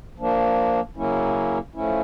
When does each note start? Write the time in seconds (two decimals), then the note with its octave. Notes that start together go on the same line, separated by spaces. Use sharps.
0.18 F3 A#3 D4
0.96 C#3 F#3 A#3 C#4 E4
1.75 F3 A3 C#4 E4